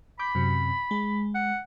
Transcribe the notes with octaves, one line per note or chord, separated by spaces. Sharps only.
B5 D6 G6
F#2 C3
G#3
F#5